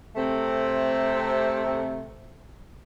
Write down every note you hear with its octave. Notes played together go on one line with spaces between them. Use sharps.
C3 A3 C4